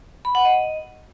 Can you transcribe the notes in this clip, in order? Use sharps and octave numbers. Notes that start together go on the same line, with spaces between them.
B5
F#5
D#5